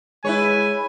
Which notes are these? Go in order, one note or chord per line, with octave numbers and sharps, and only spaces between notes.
G#3 E4 B4 C#5 G#5